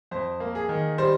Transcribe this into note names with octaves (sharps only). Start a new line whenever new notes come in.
F2 C5
A#3
G#4
D#3
G3 C5